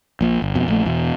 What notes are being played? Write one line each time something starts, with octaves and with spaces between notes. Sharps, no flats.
A#1 A#2
G1
F2 B2
A#1 A3
E2 B2